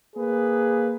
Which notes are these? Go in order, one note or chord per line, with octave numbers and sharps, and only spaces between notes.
A#3 G#4 B4